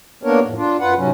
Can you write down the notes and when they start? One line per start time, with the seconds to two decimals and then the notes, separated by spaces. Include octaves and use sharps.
0.23 A#3 B3 D4 A#4 C#5
0.44 F2 A2
0.57 D4 F4
0.80 F#2 F4 B4 F#5
0.97 G#2 C3 F#3 C#4